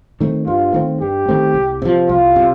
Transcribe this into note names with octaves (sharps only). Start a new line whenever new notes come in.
D#3 A3 C4
G2 F4
D#3 A3 C4
G2 G4
D#3 A3 C4
C2
C3 F3
C2 F4
C3